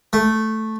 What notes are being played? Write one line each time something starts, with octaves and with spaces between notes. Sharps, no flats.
A3